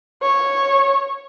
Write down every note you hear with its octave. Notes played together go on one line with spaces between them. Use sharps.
C#5